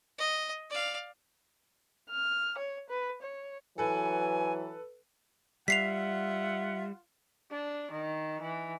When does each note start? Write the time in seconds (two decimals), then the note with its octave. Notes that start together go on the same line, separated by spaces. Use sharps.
0.19 D#5
0.70 D5 F5
2.11 F6
2.58 C#5
2.90 B4
3.22 C#5
3.78 E3 F#3 A4 B4 G#5
5.68 G3 F4 E5 F#5 B6 C7 F7
7.51 D4
7.91 D#3
8.41 E3